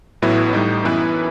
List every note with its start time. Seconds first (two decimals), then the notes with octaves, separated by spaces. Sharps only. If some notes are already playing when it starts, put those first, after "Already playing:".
0.22 A1 A2 F#3 B3 E4
0.53 A2 G3 D#4
0.84 F#2 E3 B3 E4 B4